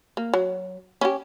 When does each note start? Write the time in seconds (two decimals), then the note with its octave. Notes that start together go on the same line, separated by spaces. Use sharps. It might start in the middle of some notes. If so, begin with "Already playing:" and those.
0.17 A#3
0.34 F#3
1.01 C#4 F4 G4